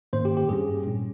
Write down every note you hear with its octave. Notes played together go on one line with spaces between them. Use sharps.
G#2 D#3 A#3 C#4 C5
G4
G4
G2 G3 C#4 G#4
A#2 G3 C#4